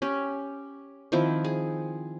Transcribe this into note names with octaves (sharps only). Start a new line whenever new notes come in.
C#4 G4
D#3 F3 C4 E4
G#4